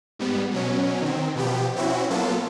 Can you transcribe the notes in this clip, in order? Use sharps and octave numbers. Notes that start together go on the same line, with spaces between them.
G#2 G3 B3
B2 F#3 C#4
D#3 C4
B2 F3 B3 G4
C4 C#4 E4 F#4
F#3 A#3 B3 F4 A4